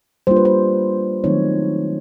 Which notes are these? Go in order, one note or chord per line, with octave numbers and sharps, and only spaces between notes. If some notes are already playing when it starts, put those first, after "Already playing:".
G3 A#3 D4 F4 C5
B4
C5
D#3 F#3 A3 C4 D#4 C#5